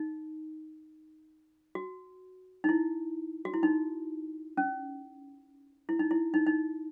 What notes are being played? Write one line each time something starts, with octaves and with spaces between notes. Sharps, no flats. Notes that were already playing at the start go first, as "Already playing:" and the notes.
Already playing: D#4
F#4
D#4
E4
F#4
E4
D#4
C#4
E4
D#4
E4
D#4
D#4